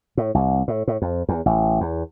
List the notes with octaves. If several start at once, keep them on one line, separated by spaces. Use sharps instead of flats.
A2
C2
A2
A2
F2
E2
A1
E2